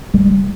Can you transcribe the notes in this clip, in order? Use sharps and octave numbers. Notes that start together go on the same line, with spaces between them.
G3